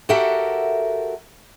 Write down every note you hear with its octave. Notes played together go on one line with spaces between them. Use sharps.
F#4 G4 A4 A#4 E5 F#5